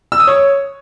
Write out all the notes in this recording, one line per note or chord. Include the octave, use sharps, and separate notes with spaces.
E6
D#6
C#5